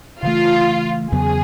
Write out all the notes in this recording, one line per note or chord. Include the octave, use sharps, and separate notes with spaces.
C#3 E3 A3 F4
E2 C#3 F#3 B3 G#4